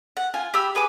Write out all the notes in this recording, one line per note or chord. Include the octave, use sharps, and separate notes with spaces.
F#5
F4 G#5
G4 B5 E6
G#4 B4 G#5 D6